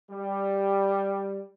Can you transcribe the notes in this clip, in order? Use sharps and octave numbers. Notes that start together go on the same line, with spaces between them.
G3